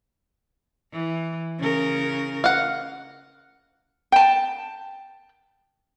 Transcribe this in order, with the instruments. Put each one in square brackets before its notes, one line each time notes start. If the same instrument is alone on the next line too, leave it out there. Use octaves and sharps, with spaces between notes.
[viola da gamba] E3
C#3 C#4 A#4
[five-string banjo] F5 F#5
[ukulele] G5 A5